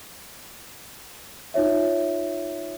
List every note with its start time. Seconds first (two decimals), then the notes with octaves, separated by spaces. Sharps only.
1.54 D#4 F4 C#5 E5